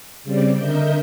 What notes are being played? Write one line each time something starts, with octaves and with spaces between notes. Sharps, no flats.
C#3 G3 C4 D5
D3 A#4 D#5 E5 G6